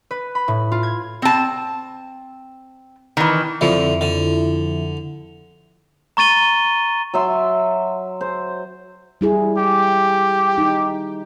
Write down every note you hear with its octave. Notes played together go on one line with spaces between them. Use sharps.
B4
B5
A2
F4
G#6
C4 A5
D#3 E3
F2 D3 F3 E4
D3
A#5 C#6 A6 D#7 G7
F#3 E5 C6
C5
G3 E4 G#4
G4
D#4